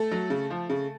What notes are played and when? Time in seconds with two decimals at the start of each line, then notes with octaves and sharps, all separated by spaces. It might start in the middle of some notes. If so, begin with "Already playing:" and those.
Already playing: A3 A4
0.11 F#3
0.30 C#3
0.50 F3
0.70 C#3